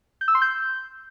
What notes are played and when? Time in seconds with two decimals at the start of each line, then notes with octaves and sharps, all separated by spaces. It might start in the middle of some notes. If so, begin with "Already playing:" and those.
0.21 G6
0.28 E6
0.35 C6
0.42 G6